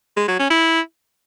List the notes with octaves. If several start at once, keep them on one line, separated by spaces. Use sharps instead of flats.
G#3
F#3
C#4
E4